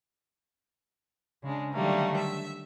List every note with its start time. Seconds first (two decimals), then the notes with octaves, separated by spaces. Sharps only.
1.43 C#3 G#3 D4
1.73 D3 D#3 F#3 G3 A3 A#3
2.17 E5